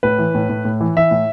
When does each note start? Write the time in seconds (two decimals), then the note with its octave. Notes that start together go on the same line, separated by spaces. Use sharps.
0.03 A2 B4
0.19 E3
0.35 A2
0.49 A2
0.65 A2
0.81 E3
0.96 E3 E5
1.11 A2